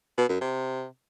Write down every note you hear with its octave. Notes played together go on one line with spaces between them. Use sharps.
B2
F#2
C3